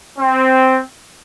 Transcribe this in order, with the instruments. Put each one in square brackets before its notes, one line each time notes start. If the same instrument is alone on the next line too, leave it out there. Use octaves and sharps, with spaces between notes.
[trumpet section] C4